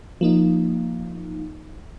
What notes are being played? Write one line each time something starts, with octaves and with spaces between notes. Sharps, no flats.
F3 A#3 D#4